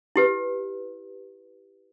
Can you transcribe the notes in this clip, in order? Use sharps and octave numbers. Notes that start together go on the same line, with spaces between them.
E4 G4 B4